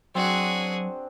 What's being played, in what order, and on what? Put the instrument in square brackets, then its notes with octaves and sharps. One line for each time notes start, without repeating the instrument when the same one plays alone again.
[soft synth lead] F#3 [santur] C4 D4 [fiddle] F#4 G#4